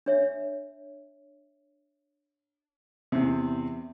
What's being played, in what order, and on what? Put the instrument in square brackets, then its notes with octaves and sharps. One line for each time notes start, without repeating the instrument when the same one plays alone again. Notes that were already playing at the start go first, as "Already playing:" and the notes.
[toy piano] D4 C#5 E5
[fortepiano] E2 C3